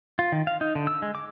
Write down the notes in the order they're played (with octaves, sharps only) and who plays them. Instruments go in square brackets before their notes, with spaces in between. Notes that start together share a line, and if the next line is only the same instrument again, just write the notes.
[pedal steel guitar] F4
D#3
F5
D#4
D3
E6
G#3
D6